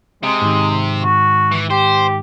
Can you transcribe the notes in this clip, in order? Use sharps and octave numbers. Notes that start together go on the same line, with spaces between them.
C3 G#3
G#2 D#3
F#4
E3
G4 C5